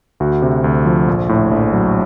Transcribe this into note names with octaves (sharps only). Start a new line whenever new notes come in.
D2 F#4
C3
D2
F3
A#1
A2
A#1
F#3